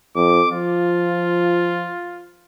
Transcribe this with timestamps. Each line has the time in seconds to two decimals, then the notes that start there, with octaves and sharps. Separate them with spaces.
0.16 F2 D6
0.51 F3 F4